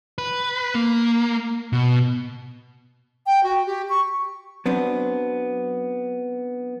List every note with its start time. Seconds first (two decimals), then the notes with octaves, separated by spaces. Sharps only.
0.18 B4
0.75 A#3
1.73 B2
3.27 G5
3.43 F#4
3.66 G4
3.89 C#6
4.66 F#3 B3 C4 D4